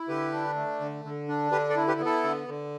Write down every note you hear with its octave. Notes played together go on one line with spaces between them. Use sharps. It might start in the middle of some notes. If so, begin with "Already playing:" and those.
Already playing: E4
D3 G4 B4
D4
A3
D3
D3
D4
D3 G4 B4
A4 D5
E4
G4 B4
B3
E4 A4
D3
D3